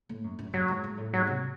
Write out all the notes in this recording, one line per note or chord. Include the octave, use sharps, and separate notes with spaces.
A2
F#2
F#2
F#2 F#3
G#2
G#2
A2
G#2 F#3
C3